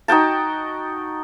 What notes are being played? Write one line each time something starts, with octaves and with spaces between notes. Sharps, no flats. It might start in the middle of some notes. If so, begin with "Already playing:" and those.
D#4 F#4 G5 A5